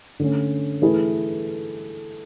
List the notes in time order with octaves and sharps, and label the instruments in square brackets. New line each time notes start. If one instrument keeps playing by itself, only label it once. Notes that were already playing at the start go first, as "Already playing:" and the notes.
[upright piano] D3 A3 C#4
E3 A3 E4 G#4 B4